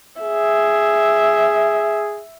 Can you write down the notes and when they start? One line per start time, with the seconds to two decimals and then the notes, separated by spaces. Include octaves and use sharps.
0.22 G#4 E5